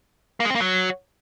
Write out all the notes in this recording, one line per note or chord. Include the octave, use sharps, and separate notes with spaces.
A#3
G#3
C4
A#3
F#3